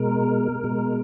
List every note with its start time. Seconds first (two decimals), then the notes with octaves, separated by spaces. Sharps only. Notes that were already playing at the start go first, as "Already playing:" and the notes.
Already playing: B2 G#3 A#4
0.64 B2 G#3